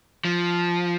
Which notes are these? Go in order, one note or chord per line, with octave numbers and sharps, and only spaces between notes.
F3